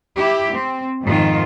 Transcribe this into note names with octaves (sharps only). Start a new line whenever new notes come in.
E4 G4
C4
F2 G#2 D#3 F4